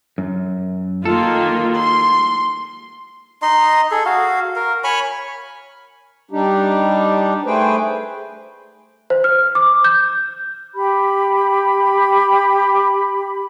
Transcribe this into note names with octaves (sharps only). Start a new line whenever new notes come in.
F#2
D#3 A#3 F4 A4
C6
D#4 D#5 C6
G#4 A4
F#4 F5
A#4
C#5 G#5 B5 C#6
G3 D4 D#4 G4
A3 G#4 B4 C5 G5
C5
F6
D6
G6
G4 B5